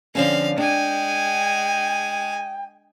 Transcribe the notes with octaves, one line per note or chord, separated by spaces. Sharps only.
D3 F3 C4 C#4 F5
G#3 D4 G5 G#5